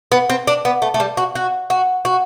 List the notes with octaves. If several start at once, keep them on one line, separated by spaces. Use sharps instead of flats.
B3
C4
D4
B3
A3
A3
G3
F#4
F#4
F#4
F#4